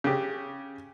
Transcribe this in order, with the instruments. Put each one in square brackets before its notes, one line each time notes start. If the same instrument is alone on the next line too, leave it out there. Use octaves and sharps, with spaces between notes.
[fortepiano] C#3 G4